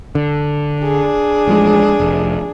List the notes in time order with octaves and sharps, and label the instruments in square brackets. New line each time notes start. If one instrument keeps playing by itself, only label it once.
[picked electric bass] D3
[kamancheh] D4 G#4
[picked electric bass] A1 F3 G#3
F1